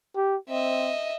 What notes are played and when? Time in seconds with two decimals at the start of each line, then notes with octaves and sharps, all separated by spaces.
0.16 G4
0.49 C4 D#5 E5